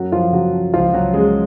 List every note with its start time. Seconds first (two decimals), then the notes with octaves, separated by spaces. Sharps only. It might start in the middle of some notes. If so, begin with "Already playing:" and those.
Already playing: F#2 F#3 F#4
0.12 F#2 F3 F4
0.33 C#3 F#3 F#4
0.53 F3
0.73 C#2 F3 F4
0.93 C#2 F#3 F#4
1.14 C#3 G#3 G#4